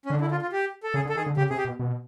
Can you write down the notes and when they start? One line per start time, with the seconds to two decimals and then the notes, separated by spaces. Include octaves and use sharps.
0.06 C#4
0.10 D3 D4
0.21 E4
0.31 F4
0.42 F4
0.52 G4
0.83 A4
0.94 C#3 G#4
1.05 D3
1.09 A4
1.15 D#3 G#4
1.26 D3
1.37 C#3 G4
1.50 C3 G#4
1.58 G4
1.65 B2
1.79 B2